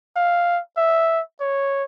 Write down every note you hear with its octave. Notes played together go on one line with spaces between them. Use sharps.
F5
E5
C#5